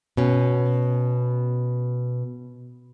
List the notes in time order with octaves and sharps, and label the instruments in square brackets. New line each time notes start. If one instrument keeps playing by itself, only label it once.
[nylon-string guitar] B2 C#4